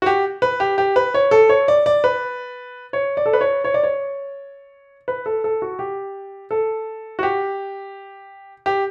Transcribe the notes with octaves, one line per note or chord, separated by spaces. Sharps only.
F#4
G4
B4
G4
G4
B4
C#5
A4
C#5
D5
D5
B4
C#5
D5
A4
B4
C#5
C#5
D5
C#5
B4
A4
A4
F#4
G4
A4
F#4
G4
G4